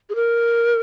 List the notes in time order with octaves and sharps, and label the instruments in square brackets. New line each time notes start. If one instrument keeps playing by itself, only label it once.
[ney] G#4
A#4